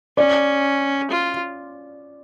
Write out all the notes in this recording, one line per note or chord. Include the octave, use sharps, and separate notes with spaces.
C#4 D5
F4